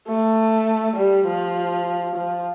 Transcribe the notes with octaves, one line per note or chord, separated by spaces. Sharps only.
A3
G3
F3
F3